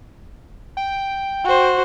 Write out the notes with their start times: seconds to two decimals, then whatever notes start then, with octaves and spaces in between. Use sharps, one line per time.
0.77 G5
1.45 F#4 C5